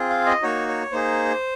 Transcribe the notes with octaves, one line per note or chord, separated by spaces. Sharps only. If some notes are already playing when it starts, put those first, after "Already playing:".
Already playing: C4 F4 G#4
F5
D#5
A#3 D#4 F#4 C#5
C#5
A#3 D#4 G#4 C5